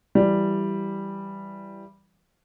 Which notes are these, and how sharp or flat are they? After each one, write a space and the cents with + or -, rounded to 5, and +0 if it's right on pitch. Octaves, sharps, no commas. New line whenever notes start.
E3 +20 G3 +0